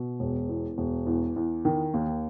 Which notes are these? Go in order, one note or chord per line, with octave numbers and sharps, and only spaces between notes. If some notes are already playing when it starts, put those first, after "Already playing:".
Already playing: B2
E1
E2
E1
E2
E2
D#3
D#2